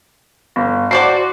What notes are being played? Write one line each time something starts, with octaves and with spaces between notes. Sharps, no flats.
G1
E4 F#4 C5 D5 C7